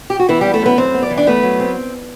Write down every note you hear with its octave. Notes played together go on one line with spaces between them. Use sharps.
G4
F#4
E3 B3 E4
E3 G3 G4
A3 A4
F#2 B3 B4
F#2 C4 C5
B3
D5
E3
D4 D5
A3 B3 B4
F#3
C4